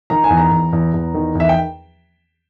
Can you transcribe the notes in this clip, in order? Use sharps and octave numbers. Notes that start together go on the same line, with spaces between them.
D#3 A#5
G#5
E2
A#5
E2
E2
E2
D#3
E2 E5
G5